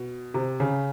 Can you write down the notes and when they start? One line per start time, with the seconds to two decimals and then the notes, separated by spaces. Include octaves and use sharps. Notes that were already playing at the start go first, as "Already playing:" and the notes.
Already playing: B2
0.34 C3
0.60 C#3